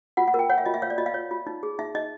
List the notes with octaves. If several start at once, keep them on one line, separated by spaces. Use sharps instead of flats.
F4 F#5
F#5
A#4
G5
C#5 F#5
E5
F4 D#5
E5
C#5 F5
D5
F4 D#5
F5
C#5
F4
D#4
G#4
D#4 E5
D#4 D#5